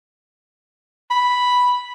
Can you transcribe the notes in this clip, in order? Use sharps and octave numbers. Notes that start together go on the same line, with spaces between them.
B5